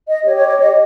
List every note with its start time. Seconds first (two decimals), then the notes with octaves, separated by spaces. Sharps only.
0.08 D#5
0.24 G4 C#5
0.36 C#5
0.47 C#5
0.59 D#5